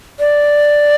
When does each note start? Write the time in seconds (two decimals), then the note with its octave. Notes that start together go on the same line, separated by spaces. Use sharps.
0.19 D5